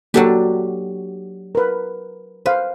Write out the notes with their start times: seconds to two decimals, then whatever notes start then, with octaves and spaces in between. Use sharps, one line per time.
0.14 F#3 A#3 D4 F#4 G4 A4
1.55 A#4 B4
2.46 B4 C5 F5